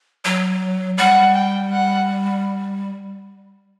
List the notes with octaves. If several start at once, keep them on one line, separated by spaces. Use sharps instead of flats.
F#3
G3 F#5
G5
F#5